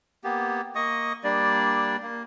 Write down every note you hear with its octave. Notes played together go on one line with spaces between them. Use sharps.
A#3 B3 G4
A#3 D#5 C#6 D#6
G3 A#3 D4 D5
A#3